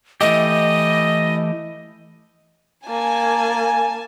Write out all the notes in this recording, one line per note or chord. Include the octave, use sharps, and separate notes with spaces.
E3 A3 G4 D#5
A#3 G#5 A5